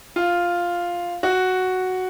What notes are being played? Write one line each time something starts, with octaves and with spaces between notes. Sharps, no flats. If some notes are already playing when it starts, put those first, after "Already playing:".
F4
F#4